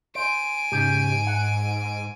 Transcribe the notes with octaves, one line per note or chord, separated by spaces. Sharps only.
C5 G#5 D7
G#2 C#3 G4
F#5